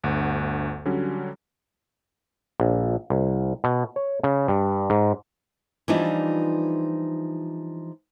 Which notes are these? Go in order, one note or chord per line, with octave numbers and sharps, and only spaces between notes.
G1 D2 F#5
D3 F#3 G3 C#4 F#4
A#1
C2
B2
C#5
C#3
G2
G#2
E3 F3 G3 D4 D#4 F4